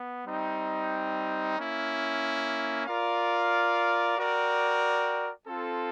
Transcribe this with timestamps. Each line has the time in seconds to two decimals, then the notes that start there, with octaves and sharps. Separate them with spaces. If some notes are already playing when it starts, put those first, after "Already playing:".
Already playing: B3
0.26 G3 C4 D#4
1.57 A#3 C#4 E4
2.87 F4 A#4 D5 F5
4.17 F#4 A#4 D5 G5
5.47 C4 F4 A4